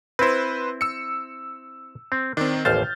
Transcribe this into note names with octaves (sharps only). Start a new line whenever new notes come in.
C4 E4 B4 C5
E6 C#7
C4
D#3 C4 D4
A1 D#2 C5 F6 G6 A6